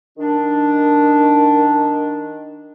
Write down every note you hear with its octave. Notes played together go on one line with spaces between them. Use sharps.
D#3 D4